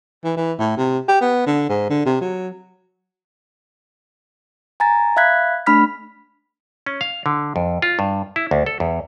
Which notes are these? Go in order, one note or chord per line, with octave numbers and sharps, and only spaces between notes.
E3
E3
A2
C3
G4
B3
D3
G#2
D3
C3
F#3
G#5 A#5 A6
E5 F5 B5 F#6 G#6 B6
A3 D4 B5 F6 B6
C#4
F5
D3
F2
F4
G2
E4
D2
A4
E2